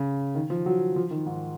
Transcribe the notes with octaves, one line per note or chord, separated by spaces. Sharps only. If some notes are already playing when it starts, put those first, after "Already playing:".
Already playing: C#3
D#3
F3
F#3
F3
D#3
G#2